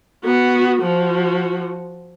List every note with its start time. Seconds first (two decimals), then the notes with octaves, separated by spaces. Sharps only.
0.24 B3 F#4
0.82 F3 F#4